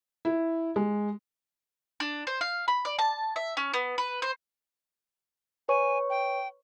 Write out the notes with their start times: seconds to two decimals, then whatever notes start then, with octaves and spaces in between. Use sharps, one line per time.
0.25 E4
0.76 G#3
2.00 D4
2.27 C5
2.41 F5
2.68 B5
2.85 D5
2.99 A5
3.36 E5
3.57 C#4
3.74 B3
3.98 B4
4.22 C5
5.69 B4 C#5 G#5 C#6
6.10 G5